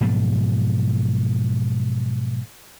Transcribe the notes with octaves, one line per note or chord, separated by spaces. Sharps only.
G#2 B2 F3 F#3